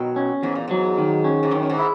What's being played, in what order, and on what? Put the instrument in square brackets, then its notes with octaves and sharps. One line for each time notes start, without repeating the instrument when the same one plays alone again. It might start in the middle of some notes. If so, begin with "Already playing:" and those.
Already playing: [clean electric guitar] B2 [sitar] D#3 F#3
[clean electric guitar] C#4
[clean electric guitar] E2 [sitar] G#2
[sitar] A#2
[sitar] G#2 [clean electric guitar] F#3
[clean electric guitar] D#3
C#4
[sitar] G#2
[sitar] F#2 [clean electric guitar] D#3
[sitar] G#2
[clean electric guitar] E4